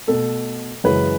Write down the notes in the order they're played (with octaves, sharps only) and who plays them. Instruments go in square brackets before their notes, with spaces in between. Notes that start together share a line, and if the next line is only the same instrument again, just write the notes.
[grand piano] B2 A3 A4
F#2 C#3 E3 G#3 B4